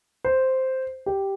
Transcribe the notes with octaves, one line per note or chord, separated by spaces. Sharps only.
C5
G4